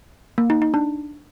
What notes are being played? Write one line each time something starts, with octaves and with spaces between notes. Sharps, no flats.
A#3
D#4
D#4
D4